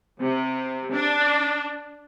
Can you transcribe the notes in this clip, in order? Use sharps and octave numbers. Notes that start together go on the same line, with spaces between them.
C3
D4